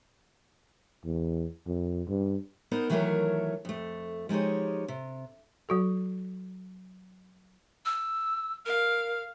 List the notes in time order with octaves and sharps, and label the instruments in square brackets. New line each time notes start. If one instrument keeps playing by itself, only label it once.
[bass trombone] E2
F2
G2
[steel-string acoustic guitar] B3 D#4 A#4 C5
D#3 E3 F#3 A3 A#4 C#5
F2 A3
F3 G#3 D#4 G4 C#5
C3
[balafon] F#3 F#4 A4
[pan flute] E6
[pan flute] A#4 [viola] F5